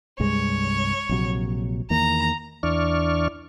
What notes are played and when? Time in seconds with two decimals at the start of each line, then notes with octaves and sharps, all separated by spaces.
0.20 C2 G2 G#3 C#5
1.09 A#1 C3 F#3
1.90 E2 D#3 A#3 A#5
2.63 E2 E3 D4 D5 C#6 F6